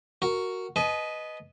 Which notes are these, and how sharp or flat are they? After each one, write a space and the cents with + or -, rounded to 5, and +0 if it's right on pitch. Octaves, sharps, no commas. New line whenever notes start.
F#4 +0 A#4 -10
B4 +0 D#5 +0 A5 -45